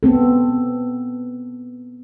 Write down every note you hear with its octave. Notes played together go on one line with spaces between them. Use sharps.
B3 C4 A4